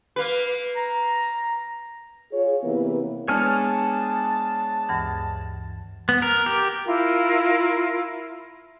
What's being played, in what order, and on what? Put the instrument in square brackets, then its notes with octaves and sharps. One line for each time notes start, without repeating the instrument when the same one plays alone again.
[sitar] A#3 B4
[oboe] A#5
[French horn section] F4 G#4 C#5
C3 E3 A#3 B3 E4 B4
[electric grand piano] G#3 B3 D4 [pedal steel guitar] C#5 G#5 F6 [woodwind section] A5
[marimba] D2 G2 E3
[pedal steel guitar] B3
A#4
G4
[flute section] E4 F4 A#4